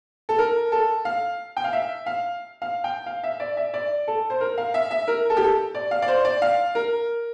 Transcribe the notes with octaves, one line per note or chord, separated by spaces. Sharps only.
A4
A#4
A4
F5
G5
F5
E5
F5
F5
G5
F5
E5
D5
E5
D5
A4
C5
A#4
F5
E5
E5
A#4
A4
G4
A4
D5
F5
D5
C5
D5
F5
A#4